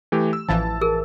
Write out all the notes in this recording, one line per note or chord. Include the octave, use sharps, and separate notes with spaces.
E3 A3 G4
E6
A1 E3 F3 A5 A6
G#4 A#4